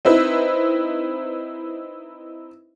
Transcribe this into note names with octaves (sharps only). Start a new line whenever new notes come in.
C4 D#4 E4 B4